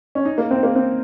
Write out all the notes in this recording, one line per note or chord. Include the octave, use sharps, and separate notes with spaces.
C#4
D#4
A#3
C4
A#3
C4